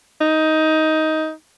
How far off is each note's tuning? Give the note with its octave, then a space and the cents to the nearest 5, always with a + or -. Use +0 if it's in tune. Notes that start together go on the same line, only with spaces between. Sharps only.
D#4 +15